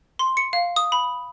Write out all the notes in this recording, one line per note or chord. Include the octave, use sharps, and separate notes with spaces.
C6
C#7
F5
D#6
B5